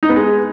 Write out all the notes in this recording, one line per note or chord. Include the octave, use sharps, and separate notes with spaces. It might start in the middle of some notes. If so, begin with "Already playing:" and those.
D#4
B3
G#3